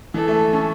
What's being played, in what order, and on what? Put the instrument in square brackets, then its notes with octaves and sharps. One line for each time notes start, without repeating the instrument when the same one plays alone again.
[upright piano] E3 [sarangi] A4
[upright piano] A3
C#4